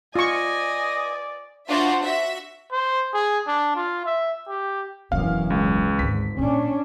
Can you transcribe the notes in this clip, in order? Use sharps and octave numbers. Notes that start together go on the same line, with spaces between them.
F4 D5 D#5 G#5 C#6
D4 F4 F#4 C5 E5 F#5
F#4 E5
C5
G#4
D4
F4
E5
G4
E1 F#2 E3 F#3 F5
C#2
G#1 D2 B6
A#2 C#4 D4